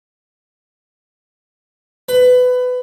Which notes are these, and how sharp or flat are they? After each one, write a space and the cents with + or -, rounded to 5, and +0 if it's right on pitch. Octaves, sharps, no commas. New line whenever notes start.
B4 +20